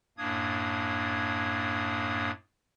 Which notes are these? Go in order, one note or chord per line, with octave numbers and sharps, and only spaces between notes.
F#2 A2 A#3 D4 D#6 G#6